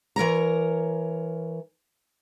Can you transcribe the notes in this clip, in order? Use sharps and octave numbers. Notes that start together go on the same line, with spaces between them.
E3 A#4 C#5 A#5